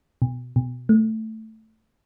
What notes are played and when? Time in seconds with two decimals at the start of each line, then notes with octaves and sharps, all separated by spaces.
0.22 B2
0.56 B2
0.89 A3